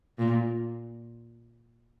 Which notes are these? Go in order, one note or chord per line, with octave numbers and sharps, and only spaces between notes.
A#2